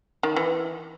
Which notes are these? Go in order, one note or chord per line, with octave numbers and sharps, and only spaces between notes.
D#3
E3